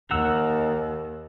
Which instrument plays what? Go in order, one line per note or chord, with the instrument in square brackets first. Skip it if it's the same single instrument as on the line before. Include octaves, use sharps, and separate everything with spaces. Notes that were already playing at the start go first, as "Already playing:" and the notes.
[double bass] D#2 [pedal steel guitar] A#4 F#5 E6